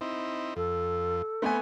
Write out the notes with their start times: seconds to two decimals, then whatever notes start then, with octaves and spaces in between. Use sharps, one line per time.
0.01 C4 D#4 E4
0.56 F2 A4
1.42 A3 B3 C4 B4 G#5